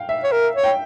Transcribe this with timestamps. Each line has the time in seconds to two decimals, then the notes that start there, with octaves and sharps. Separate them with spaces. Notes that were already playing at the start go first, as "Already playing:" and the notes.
Already playing: F5 G5
0.09 E5
0.23 C#5
0.32 A#4
0.55 C#5
0.64 G5